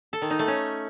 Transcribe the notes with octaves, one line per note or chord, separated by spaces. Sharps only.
A4
D#3
D#4
A3
C#4